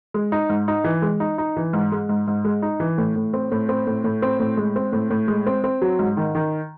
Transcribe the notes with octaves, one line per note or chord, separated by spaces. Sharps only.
G#3
D#4
G#2
D#4
E3
G#3
D#4
D#4
E3
G#2
G#3
G#2
G#2
G#3
D#4
E3
A2
A2
C4
A2
C4
A2
A2
C4
A2
G#3
C4
A2
A2
G#3
C4
C4
F#3
G#2
D#3
D#3